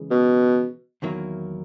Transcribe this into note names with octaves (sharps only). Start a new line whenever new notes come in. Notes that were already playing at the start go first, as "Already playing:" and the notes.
Already playing: C#3 E3 G#3
B2
E2 D#3 F#3 A#3 E4